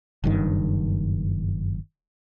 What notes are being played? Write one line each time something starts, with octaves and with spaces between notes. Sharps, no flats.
F#1 G2 D#3